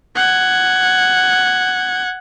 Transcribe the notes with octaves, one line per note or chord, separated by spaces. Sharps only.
F#5 G#6